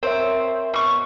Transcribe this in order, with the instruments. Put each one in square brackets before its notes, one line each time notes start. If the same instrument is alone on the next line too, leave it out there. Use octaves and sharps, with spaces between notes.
[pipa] C4 [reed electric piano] A#4 C#5 E5
[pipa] B2 C#6